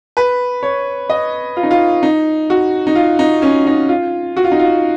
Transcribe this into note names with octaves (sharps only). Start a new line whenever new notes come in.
B4
C#5
D#5
F4
D#4
F4
D#4
F#4
D#4
F4
D#4
C#4
D#4
F4
F#4
F4
D#4
F4